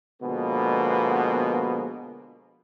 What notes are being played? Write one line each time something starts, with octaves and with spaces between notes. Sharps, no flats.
B2 D3 F3 G#3 A#3 B3